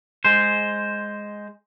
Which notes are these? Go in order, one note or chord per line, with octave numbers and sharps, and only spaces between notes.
G#3 C5